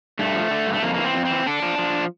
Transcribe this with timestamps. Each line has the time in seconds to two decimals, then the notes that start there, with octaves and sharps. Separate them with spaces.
0.19 G2 A3
0.35 F3
0.51 D3
0.67 G2
0.73 A3
0.83 F2 A#3
0.94 E3 A#3
1.04 C4
1.15 F2
1.25 C4
1.31 E3
1.46 D3 D4
1.62 F3
1.78 F3